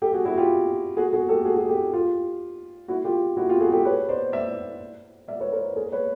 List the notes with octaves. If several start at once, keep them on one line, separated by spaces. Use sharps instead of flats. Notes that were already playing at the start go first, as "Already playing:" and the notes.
G4 A4
F#4 G#4
E4 F#4
F4 G4
F#4 G#4
F#4 G#4
G4 A4
F#4 G#4
F#4 G#4
G4 A4
F4 G4
E4 F#4
F4 G4
E4 F#4
F4 G4
F#4 G#4
G4 A4
B4 C#5
C5 D5
D5 E5
D5 E5
B4 C#5
A#4 C5
G#4 A#4
B4 C#5